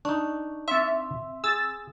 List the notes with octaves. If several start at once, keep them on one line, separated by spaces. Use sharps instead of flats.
D4 D#4 C#6
C4 E5 C6
G#4 E6 A6